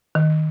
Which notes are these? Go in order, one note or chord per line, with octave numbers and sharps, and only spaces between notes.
D#3